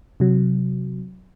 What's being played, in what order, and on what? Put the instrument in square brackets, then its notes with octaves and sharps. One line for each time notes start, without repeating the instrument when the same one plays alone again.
[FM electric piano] C3 F#3